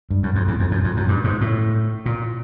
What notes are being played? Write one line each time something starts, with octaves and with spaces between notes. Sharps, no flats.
G2
F#2
F2
E2
F2
F#2
F2
F#2
G2
G#2
A2
A#2